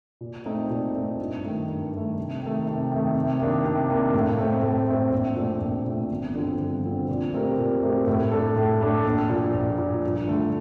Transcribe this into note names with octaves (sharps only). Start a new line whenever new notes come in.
A#2
A3 C4 D#4
A#2
A3 C4 D#4
G2
D#3 A3
G2
D#3 A3
C3
D#3 A3
C3
D#3 A3
C3
D#3 A#3 D4
C3
D#3 A#3 D4
A2
A3 C4
A2
A3 C4
A#1
A#2 A3 C4
A#1
A#2 A3 C4
G1
G2 D3 F3 C4
G1
G2 D3 F3 C4
A#2
A3 C4 G4 A#4
A#2
A3 C4 G4 A#4
A2
A3 D4 A4
A2
A3 D4 A4
A#1
A#2 F3
A#1
A#2 F3
G2
D3 A3